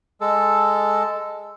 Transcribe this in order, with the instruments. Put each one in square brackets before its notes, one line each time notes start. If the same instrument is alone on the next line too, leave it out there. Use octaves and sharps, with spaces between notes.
[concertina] G#3 A4